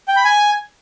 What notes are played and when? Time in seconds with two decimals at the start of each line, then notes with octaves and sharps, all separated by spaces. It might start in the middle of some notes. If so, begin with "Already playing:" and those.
0.08 G5
0.16 B5
0.24 G#5